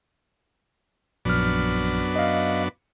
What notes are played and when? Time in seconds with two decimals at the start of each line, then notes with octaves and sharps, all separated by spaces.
1.25 A#1 F#2 B3 D4 F6
2.16 D#5 F5